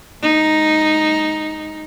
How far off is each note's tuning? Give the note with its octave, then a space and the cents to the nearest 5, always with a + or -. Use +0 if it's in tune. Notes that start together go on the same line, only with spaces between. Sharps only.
G#3 +0 D#4 +0